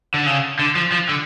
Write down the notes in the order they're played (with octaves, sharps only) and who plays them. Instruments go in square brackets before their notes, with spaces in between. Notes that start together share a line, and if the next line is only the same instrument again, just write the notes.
[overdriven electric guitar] D3
C#3
D3
F3
F3
D3